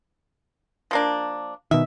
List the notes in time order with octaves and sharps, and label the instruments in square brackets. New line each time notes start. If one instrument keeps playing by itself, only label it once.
[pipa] F3 A#3 D4
[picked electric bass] B2 D#3 [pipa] E5